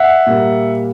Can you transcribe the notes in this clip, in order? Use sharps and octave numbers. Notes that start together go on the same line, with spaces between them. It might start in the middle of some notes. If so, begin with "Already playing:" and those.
Already playing: E5 F#5
A#2 G3 A#3